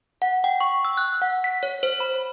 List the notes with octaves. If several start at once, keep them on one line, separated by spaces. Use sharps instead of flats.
F#5
G5
C#6
E6
F#6
F#5
B6
C#5
C5
B5